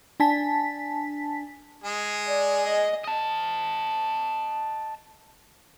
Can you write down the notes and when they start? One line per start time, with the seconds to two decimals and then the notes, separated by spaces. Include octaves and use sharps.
0.20 D4 G#5 A5 B6
1.84 G#3 G#4
2.28 D5
2.66 D#5
3.04 D#5 A5